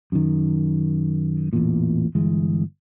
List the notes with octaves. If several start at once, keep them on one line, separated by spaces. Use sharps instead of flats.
F#2 D#3
A1 E2 A#2
G1 E3 G#3